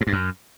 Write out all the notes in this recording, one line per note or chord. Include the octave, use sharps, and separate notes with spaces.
G#2
G2
F#2